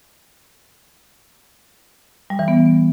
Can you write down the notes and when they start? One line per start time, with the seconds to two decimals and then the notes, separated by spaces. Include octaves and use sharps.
2.30 G3
2.39 E3
2.48 B3